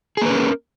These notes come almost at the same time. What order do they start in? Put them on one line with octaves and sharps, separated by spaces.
G#4 A#3 B4 C#4 A#4